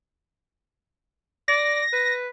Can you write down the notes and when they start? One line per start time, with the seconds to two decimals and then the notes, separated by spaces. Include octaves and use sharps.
1.48 D5 A#6
1.92 B4